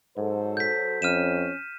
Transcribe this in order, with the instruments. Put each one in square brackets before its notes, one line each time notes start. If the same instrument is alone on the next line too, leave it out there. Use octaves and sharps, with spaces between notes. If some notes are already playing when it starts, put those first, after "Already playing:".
[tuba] G#2 [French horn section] F#3 A4 C5
[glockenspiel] G6 B6
[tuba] F2 [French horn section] C#4 [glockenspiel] F6 D#7 E7